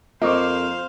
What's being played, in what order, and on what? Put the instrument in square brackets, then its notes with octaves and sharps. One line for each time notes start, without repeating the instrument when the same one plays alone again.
[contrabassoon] F2 [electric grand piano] A#3 [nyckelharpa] C5 F5 [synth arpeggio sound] D#5 C#6 D6